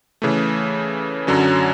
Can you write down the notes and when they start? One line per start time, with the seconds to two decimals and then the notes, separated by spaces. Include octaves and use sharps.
0.22 C#3 E3 A3
1.27 F#2 D3 F#3 C#4